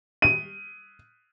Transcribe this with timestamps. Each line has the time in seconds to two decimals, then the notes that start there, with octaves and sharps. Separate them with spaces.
0.22 D#7